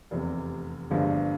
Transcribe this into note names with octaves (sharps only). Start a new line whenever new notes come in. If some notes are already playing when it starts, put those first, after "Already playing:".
F1 E2 C3
G1 G2 D3 F3 G#3